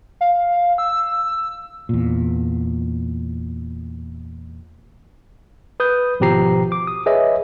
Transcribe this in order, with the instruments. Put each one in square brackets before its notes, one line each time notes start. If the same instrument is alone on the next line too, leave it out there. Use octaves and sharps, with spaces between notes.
[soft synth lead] F5
E6
[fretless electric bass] E2 A#2
[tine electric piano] B4 D#6 G6
G#1 B2 F3 G4 A#5 C7
D6
D#6
G#4 B4 C#5 D#5 E5